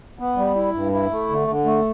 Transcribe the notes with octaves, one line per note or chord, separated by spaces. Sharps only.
B3
G3
E4
G2
E4
A3
D3
D3
A3